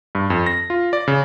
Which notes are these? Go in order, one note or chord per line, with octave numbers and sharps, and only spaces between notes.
G2
F2
A#6
F4
D5
C#3